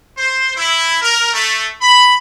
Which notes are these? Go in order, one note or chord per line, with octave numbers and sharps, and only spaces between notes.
C5
E4
A#4
A3
B5